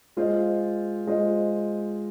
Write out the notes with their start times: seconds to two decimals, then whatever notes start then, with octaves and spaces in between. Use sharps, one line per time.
0.17 G#3 F4 C5 D#5
1.07 G#3 F4 C5 D#5